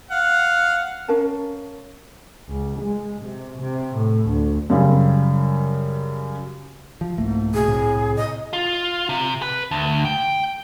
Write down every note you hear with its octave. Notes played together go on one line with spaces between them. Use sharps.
F5 F#5
C#4 A#4 F5 A5
C#2
G#3
C3
C3
A2
D2
F#2 C#3 G3
F3
C2 G#2 A3 A#3
B2 G#4
C2 A2 C3
D#5
F4
C3
B4
D2
G5